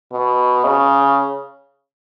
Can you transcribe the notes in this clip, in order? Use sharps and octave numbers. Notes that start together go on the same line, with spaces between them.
B2
C#3